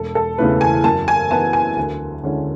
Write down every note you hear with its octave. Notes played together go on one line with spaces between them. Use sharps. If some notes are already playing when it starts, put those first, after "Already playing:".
Already playing: E1 A4
A4
E2 C#3 E3 A3 B4
G#5
F#2 A5
G#5
E3 B3 E4 A5
G#5
D2
D3 G#3 C#4 E4